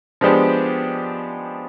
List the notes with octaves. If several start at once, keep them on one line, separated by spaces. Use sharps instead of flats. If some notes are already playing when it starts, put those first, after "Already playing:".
F3 G#3 B3 D4 G4